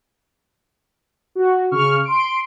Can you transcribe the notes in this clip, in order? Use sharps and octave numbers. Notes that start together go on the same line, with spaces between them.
F#4
C#3 C#6 F6
C6 D7